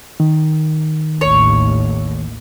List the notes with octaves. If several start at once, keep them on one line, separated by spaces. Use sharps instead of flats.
D#3
A1 D#2 A2 C#5